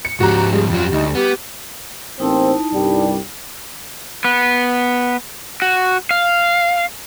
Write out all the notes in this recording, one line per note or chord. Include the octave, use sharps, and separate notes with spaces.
C#7
G#2 F3 F#4 G4 A#5
G3 G#4
F2 F#3 F4
D2 D#4
B3 G4
A1 A#3 C4 D#4 E4 A5
C2 G2 G3
B3
F#4
F5